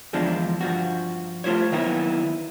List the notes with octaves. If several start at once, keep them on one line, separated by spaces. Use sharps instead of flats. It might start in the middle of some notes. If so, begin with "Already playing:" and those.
E2 D3 F3 G#3 D4
G2 F3 F#4
A3 F4 C5 C#5
D#3 F#3 A#3 B3 D#4 E4